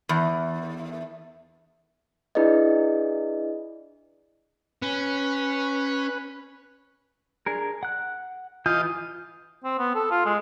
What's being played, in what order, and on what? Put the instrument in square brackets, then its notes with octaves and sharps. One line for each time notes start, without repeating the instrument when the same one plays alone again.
[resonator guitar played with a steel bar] E2
[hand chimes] D4 E4 G#4 B4 D5 D#5
[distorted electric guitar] C#4 [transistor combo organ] B4
[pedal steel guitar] D4 G#4 A#4
F#5 F#6
[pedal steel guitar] E3 G#5 G6 [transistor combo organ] F4 D#5
[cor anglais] C4
B3
A4
F4
G#3